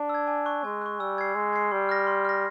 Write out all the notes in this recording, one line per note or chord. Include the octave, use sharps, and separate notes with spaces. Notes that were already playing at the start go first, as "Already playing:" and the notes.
Already playing: D4
E6 G#6
G#5
C#6 F#6
G#3 G#5
C#6 F#6
G3 E6
G#6 C7
G#3 E6
G#6 C7
G3 C6
F6 A#6
C6
F6 A#6